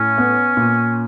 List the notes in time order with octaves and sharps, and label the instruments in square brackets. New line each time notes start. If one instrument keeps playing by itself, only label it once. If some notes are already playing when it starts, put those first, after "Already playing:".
Already playing: [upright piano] A2 [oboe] C#4
[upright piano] B3
A#2